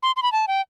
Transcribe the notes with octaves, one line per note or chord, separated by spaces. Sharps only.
C6
C6
B5
A5
G5